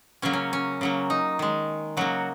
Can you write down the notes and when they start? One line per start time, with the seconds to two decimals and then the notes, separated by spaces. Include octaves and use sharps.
0.22 C#3 F#3 A#3 C#4 C#5
0.33 C#4
0.53 C#4
0.81 C#3 F#3 A#3
1.10 D#4
1.39 D#3 G#3
1.97 C#3 F#3 A#3 F#4